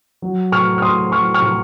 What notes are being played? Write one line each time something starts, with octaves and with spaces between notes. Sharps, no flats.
F#3
A2 C#6 F6
F6
A2 C6 D#6
F#3 C#6 F6
C#6 F6
A2